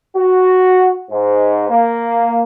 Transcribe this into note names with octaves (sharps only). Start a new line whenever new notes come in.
F#4
G#2
A#3